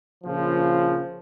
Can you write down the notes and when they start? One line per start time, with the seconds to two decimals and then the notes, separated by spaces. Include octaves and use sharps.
0.24 A#1 C#3 F3